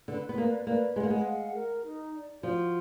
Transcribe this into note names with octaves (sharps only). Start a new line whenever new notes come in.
D3 B4
B3
A#3 D5
A#3 B4
G#3 F#5
A#3
G#3
F5
A#4
D#4
D5
F3 F#4